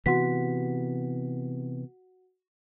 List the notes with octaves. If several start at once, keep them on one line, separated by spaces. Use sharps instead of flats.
C3 E3 B3 F#4 F#5 B6